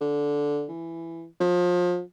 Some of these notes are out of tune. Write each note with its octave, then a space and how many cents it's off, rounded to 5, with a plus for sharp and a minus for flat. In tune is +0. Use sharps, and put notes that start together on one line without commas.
D3 -10
E3 +10
F3 +30